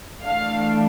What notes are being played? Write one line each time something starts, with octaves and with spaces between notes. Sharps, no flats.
E3 A3 D4 F5